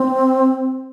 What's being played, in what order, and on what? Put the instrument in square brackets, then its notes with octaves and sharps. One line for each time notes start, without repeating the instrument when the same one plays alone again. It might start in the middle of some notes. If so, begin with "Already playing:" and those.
Already playing: [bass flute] C4